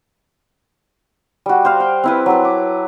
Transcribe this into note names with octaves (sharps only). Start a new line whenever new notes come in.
G3 F#4
C5 F5
G5
C4 E4 B4
F#3 A4 B4
D6